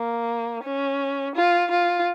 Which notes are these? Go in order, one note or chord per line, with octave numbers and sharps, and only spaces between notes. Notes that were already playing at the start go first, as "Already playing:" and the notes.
Already playing: A#3
C#4
F4
F4